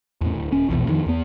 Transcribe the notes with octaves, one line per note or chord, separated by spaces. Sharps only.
E2 A2
D1
D#1 C#4
A#1 E2 B2
F2 D#3
E2 B3